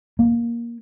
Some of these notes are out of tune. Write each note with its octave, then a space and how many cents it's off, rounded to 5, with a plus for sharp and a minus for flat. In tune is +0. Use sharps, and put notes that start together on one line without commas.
A#3 +10